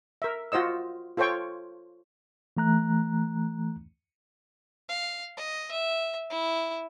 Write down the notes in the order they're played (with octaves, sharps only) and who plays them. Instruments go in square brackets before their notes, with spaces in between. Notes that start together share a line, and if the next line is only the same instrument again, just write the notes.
[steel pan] A#4 E5
F4 F#4 C5 D#5 E6
F4 A4 C5 C#5 G5 C#6
[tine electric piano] E3 A3 A#5 F#6
[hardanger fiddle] F5
D#5
E5
E4